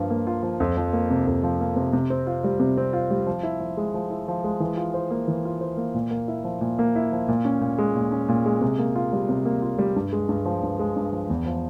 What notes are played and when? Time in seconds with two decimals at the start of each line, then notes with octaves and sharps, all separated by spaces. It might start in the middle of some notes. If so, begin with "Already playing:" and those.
Already playing: G2 F3 A#3 F4
0.10 A#3
0.27 F4
0.43 F3
0.60 F2
0.77 F3
0.93 A#3
1.10 C3
1.26 F2
1.43 F3
1.60 A#3
1.76 C3
1.93 C3
2.10 C4
2.27 F4
2.44 G3
2.60 C3
2.77 C4
2.93 F4
3.11 G3
3.27 F3
3.43 E4
3.60 F3
3.77 G#3
3.94 F3
4.10 E4
4.28 F3
4.44 G#3
4.60 E3
4.77 F4
4.94 C5
5.11 A#3
5.28 E3
5.45 F4
5.61 C5
5.77 A#3
5.95 A#2
6.11 A#3
6.28 E4
6.44 F3
6.61 A#2
6.79 A#3
6.96 E4
7.12 F3
7.28 A#2
7.45 C#4
7.61 A#2
7.78 G#3
7.95 A#2
8.12 C#4
8.28 A#2
8.46 G#3
8.61 C3
8.79 A#3
8.95 F4
9.13 G3
9.29 C3
9.45 A#3
9.62 F4
9.79 G3
9.96 G2
10.13 G#3
10.29 G2
10.45 F3
10.63 G2
10.79 G#3
10.96 G2
11.12 F3
11.29 E2
11.46 F3